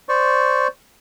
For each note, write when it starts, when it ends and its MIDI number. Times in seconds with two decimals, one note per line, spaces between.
0.09 0.68 72
0.09 0.68 74
0.09 0.68 85